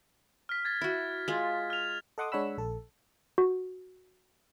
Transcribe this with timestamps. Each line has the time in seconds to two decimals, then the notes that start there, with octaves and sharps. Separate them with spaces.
0.49 F6 B6
0.65 G#6 A6 B6
0.81 E4 F#4
1.28 G#3 F4
1.70 F6 F7
2.18 A4 D#5 F#5 C6 D6 D#6
2.32 G#3 D4 C#5 F#5 B5 E6
2.58 A#1 A4
3.38 F#4